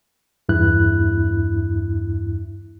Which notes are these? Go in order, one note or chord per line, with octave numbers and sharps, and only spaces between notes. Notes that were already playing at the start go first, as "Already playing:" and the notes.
E2 G2 E4 F#6